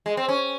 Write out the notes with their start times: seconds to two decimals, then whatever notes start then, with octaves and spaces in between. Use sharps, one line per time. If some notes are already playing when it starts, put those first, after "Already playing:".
0.06 G#3
0.17 C4
0.29 C#4